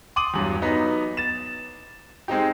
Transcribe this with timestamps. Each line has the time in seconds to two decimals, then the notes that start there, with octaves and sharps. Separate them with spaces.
0.16 C6 D6 D#6 D#7 F#7
0.34 E2 G2 F#3
0.62 F#3 B3 D#4
1.17 A6 E7
2.28 G#3 C4 D#4 G4